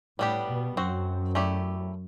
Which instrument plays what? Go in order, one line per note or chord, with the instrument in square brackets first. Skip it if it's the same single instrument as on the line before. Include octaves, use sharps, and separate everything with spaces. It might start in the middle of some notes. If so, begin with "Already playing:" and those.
[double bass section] A2 [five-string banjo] G3 B3 D4 G4
[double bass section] B2
[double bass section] F#2 [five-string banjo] C4 F#4 C5
[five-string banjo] A3 E4 G4 D5